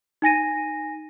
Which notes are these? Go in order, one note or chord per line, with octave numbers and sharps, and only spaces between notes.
D#4 G#5 A#6 D#7